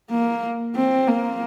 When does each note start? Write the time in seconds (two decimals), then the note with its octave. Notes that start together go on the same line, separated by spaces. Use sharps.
0.10 A#3
0.76 C4
1.07 A#3